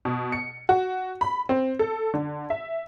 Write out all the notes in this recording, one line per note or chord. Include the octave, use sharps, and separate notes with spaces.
B2
C#7
F#4
B5
C4
A4
D3
E5